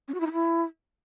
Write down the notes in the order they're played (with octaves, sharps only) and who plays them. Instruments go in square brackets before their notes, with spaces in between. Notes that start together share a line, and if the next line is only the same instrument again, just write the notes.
[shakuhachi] C#4
F#4
E4
D#4
E4